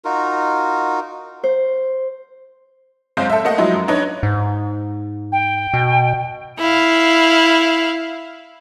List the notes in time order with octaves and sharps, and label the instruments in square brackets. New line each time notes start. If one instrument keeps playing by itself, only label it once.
[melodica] D#4 F4 F#4 A#4
[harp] C5
[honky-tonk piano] F#1 G#3 C4 C5 F5 G6
A4 E5
A3 A#3 D#5 F#5
F3 F#3 G#3 D#4 E4
F#2
D4 D#4 B4 C#5
[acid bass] G#2
[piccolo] G5
[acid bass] B2
[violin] E4 F5